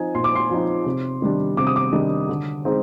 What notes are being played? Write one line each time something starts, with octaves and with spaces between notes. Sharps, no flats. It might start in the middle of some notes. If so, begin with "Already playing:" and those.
Already playing: F3 C4 D#4 G#5
A#2 C6
D6
C6
F3 C4 D#4
C3
D#3 G3 D4
C3 D6
D#6
D6
D#3 G3 D4
D3
G#3 C4 D#4